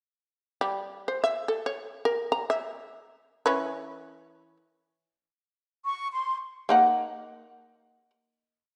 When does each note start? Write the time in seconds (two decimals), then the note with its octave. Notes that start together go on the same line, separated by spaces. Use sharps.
0.61 G3
1.08 C5
1.24 E5
1.48 A4
1.66 C#5
2.05 A#4
2.32 A#5
2.50 E5
3.46 E3 C#4 B4
5.85 C#6
6.13 C6
6.69 A#3 D#4 F#5